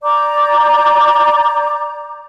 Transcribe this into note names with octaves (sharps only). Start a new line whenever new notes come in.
D5 A#5 D6 G6